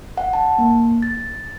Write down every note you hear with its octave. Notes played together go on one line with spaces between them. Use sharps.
F#5
A5
A#3
A6